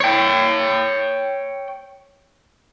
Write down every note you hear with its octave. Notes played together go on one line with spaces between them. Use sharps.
C#5 G5